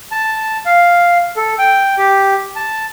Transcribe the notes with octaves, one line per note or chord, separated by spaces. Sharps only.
A5
F5
A4
G5
G4
A5